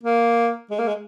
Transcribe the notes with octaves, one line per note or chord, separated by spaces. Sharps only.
A#3
G#3
A#3
G#3